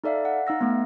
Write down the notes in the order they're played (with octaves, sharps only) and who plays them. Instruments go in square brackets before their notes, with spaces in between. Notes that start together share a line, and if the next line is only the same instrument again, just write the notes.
[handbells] D#4 A4 D5 E5 F5
F#5
D#4 F5 E6 A#6
A3 B3